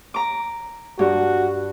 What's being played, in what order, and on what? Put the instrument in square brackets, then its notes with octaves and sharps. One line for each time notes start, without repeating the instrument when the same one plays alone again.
[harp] A#5 D6
[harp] G2 [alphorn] F#4